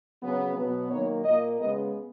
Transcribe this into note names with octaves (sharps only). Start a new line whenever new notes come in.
C#3 F#3 B3
B2 F#3 B3
D#3 F#3 A#3 C#5
A#2 A#3 D#5
C#3 G#3 B3 D#5